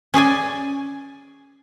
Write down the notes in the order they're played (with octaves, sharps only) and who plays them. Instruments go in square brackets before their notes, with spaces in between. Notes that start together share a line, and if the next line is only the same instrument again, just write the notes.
[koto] C#4 G#4 D5 G#5